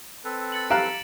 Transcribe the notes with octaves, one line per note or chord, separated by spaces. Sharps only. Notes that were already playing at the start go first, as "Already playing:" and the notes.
C4 A4 B4
A6 C#7 F#7
G4 F5 A#5 F#6 D7 E7